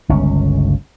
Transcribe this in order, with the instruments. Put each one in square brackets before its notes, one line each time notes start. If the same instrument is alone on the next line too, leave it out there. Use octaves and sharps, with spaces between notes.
[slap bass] G1 C#2 C#4